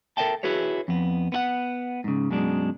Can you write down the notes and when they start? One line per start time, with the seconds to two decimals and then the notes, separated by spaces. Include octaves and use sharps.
0.17 A4 A#4 D#5 E5 G5 A5
0.43 E4 F#4 G#4 B4 C#5
0.88 F2 B3
1.32 B3 E4 F#5
2.04 G#2 C#3
2.31 F#2 B2 G#3 D4